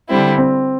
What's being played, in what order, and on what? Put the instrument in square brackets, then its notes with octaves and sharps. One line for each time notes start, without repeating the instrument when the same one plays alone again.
[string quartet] D3 G3 C4 E4
[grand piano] C4